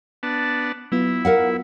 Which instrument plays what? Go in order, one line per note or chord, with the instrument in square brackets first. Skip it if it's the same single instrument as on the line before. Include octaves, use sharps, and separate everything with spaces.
[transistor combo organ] B3 D4 A5
[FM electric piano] F#3 B3 F4 [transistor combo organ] E4
[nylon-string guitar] A#4 F5 F#5